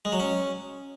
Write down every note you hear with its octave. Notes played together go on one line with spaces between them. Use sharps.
G#3
F#3
C#4